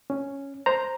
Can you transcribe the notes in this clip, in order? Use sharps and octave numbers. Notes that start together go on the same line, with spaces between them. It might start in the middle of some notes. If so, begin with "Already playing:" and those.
C#4
C5 A#5